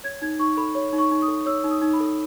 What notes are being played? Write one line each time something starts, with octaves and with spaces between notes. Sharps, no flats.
C#5 G#6
D#4 G#6
D#4 C#6
A4 B5
C#5 B5
D#4
C#6
D#4
D#6
A4
C#5 E6
D#4
D#6
D#4
B5
A4